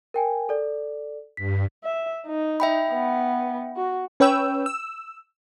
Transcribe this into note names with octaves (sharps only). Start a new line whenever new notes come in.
A#4 G5 G#5
A4 D5
G2 B6
E5
D#4
E5 G5 B5
B3
F#4
C#4 B4 C#5 G5 E6
E6